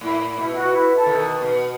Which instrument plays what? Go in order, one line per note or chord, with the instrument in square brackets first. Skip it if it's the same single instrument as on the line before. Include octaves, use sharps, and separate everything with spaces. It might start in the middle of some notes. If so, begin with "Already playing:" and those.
[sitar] A2 [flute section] E4
[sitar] B2 [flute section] E4
[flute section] F#4
E4
A4
[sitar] B2 D#3
B2